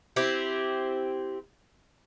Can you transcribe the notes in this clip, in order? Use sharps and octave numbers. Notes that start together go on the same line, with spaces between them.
C4 E4 G4